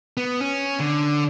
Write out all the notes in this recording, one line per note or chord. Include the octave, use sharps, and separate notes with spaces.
B3
C#4
D3